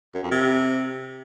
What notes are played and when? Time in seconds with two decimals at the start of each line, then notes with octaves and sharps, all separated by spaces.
0.15 F#2
0.23 F2
0.31 C3